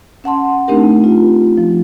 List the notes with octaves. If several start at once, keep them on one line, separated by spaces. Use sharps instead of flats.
C#4 F#5 A5 C6
A3 C4 D4 D#4 G4 A#4
F4
F3